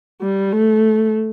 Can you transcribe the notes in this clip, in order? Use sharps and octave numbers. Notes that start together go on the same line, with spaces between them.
G3
A3